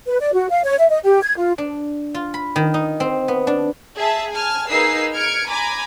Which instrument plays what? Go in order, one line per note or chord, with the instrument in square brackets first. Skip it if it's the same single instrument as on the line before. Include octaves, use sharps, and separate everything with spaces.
[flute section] B4
D5
F#4
F5
C#5
E5
D#5
G4
G#6
F4
[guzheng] D4
F4
B5
D#3
D#4
C4
B3
D4
[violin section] G#4 E5 A5
G#5 A5 F6
A#3 D#4 G#4 B4 E6 C7
F6 G#6 C#7 D7
G#5 A#5 B5 D6